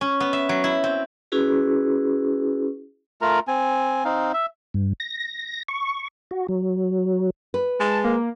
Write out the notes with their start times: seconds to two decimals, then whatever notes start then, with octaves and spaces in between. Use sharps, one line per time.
0.01 C#4
0.20 B3
0.33 E5
0.49 F#3
0.64 E4
0.84 C4
1.32 C#4 E4 F#4 G#4 B4
3.22 A3 F4 A#4 A#5
3.48 C4 G#5
4.05 C4 D#4 F5
4.34 E5
4.74 G2
5.00 A#6
5.68 C#6
6.31 F#4
6.48 F#3
7.54 B4
7.80 G#3 A5
8.04 A#3